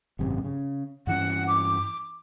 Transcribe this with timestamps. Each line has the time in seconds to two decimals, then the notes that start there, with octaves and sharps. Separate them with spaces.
0.19 G#1 F#2 C3
0.45 C#3
1.07 G2 E3 C#4 F#5
1.48 D6